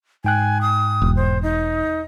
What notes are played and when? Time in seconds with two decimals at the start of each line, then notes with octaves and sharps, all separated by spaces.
0.25 G#2 G5 G#5 F#6
0.62 D#6
1.02 E1
1.16 C5
1.42 D#4